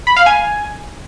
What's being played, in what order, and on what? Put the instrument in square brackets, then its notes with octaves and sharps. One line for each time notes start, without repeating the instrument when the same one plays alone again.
[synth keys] B5
F5
G#5